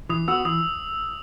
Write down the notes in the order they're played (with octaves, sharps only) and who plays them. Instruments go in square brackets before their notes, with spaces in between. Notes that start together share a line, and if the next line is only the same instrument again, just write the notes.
[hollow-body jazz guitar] E3 [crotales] D#6
[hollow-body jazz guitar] B3 F#4 [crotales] E6
[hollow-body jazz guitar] E3 [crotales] D#6